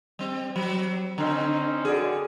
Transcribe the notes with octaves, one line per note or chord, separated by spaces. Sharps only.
G3 C4
F#3
D3 C4 C#4 D#4
F#2 D3 G#4